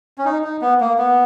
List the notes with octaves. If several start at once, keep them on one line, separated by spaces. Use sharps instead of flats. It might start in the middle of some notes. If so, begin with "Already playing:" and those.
C#4
D#4
D#4
B3
A#3
B3